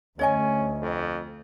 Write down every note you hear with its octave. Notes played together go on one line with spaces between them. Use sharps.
D2 C#4 C#5 D#5 G#5
F2